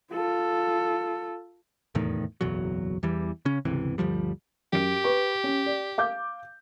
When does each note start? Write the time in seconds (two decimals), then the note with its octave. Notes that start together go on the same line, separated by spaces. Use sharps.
0.12 F4 A4
1.95 F1 E2 A2 D#3
2.41 F#1 B1 E2 F#3
3.03 E2 E3 G3
3.45 C#3 C#4
3.65 G1 C#2 C3 E3
3.98 G1 D2 F3 G3
4.73 F#2 G4 D7
5.04 B4 C#6
5.44 C#4
5.66 D5
5.98 F5 D6 G6